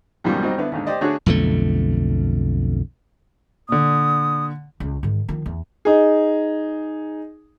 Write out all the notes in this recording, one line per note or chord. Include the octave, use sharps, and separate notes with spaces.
C#2 F#2 B2 D#3 F3 G3
F#3 G3 C4 D#4
D3 B3 E4
D#2 G#2 D3
G4 C5 D5 D#5
D3 A3 D4 F#4 G#4 C#5
B1 F2 D3 A3
A#2 D3 D#6
C#2
G#2 D#3
D#3 F3
E2
D#4 G#4